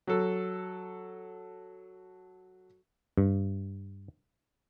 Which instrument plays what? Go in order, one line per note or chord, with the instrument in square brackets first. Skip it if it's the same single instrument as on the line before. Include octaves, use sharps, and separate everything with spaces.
[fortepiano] F#3 A4
[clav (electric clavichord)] G2